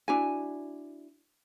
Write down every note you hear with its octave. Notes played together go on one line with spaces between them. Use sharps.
D4 E4 F#4 G#5